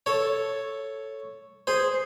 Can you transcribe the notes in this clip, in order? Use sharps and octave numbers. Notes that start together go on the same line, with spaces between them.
A4 C#5
G#4 C5